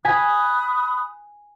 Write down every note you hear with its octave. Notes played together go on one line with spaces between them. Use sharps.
G#5 B5 D#6 F#6 B6